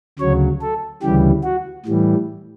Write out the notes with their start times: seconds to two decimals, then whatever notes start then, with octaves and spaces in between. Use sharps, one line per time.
0.19 D2 C#3 F#3 C#5
0.61 A4
1.02 D2 C#3 E3 G3 G4
1.44 F#4
1.85 A2 E3 G3